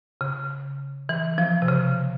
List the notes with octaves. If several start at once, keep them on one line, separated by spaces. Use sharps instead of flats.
C#3
E3
F3
C3
C#3